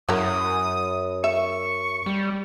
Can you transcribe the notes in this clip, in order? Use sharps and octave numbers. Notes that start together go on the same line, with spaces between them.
F#2 F#3 E4 A#4 D#6
E5 C#6
G3